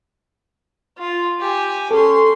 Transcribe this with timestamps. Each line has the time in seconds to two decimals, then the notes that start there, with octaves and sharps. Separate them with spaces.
0.98 F4
1.40 G4 G#5
1.91 C#4 A4 C6